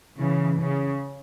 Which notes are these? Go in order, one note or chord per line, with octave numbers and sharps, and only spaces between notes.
C#3 E3
C#3